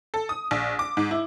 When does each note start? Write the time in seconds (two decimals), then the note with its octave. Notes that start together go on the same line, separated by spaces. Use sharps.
0.14 A4
0.29 D#6
0.51 A#1
0.79 D6
0.97 G#2
1.11 E4